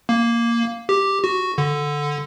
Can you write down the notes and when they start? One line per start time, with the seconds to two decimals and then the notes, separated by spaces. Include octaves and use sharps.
0.09 A#3
0.89 G4
1.24 F#4
1.58 D3